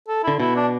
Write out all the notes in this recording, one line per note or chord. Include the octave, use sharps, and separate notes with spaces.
A4
D3 E4
B2 E4
D4